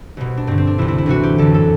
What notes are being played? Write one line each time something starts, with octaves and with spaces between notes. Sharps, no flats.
C2 B2
D4
G2 D3 C4
C4
D4
D2 C3 E3 E4
E4
E4
D2 C3 E3 F#4
G4
F#2 D3 A4
A4